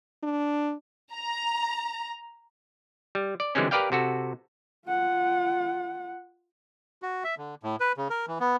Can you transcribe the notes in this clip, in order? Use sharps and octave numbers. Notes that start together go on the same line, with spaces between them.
D4
A#5
G3
D5
D3 E3 G3 G#3 C4 C#4
G4 A#4 B4 D5 F5 G5
C3 F#4 A4
F4 F#5
F#4
E5
D3
A2
B4
C#3
A#4
E3
B3